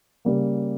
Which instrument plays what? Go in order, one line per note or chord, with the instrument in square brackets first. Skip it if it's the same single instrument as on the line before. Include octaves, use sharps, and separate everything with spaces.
[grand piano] C#3 G3 A#3